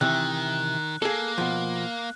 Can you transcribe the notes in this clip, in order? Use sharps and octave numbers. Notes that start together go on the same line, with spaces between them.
C3 D#3 E3 F#6
A#3 G#4 A4
B2 F3